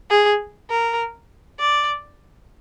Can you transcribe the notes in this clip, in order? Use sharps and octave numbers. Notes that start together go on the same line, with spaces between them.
G#4
A#4
D5